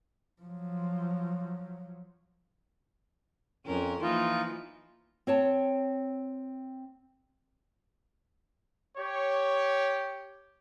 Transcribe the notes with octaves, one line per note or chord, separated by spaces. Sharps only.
F3 F#3
F2 C#4 A#4
E3 F3 A#3 D#4 F4
C4 C#5 A5
G4 C#5